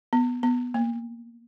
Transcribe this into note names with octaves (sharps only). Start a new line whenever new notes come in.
B3
B3
A#3